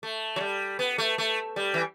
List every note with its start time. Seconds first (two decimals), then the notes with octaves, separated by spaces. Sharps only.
0.03 A3
0.36 F#3
0.41 G3
0.79 B3
0.98 A3
1.18 A3
1.56 G3
1.74 E3